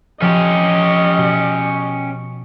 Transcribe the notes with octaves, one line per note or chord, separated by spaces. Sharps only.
F3 C#4 G4 D#5 A#5
B2